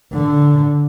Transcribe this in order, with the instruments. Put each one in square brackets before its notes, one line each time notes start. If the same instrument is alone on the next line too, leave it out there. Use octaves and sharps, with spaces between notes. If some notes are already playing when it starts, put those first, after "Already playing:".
[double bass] D3